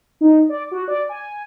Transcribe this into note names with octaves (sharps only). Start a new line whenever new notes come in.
D#4
D5
F#4
D5
G#5